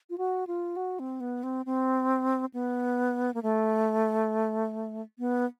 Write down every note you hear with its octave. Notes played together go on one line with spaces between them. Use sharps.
F4
F#4
F4
F#4
C4
B3
C4
C4
B3
A#3
A3
B3